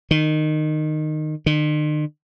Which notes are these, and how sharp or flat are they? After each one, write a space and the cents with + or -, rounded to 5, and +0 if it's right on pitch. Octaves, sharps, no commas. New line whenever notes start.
D#3 -15
D#3 -45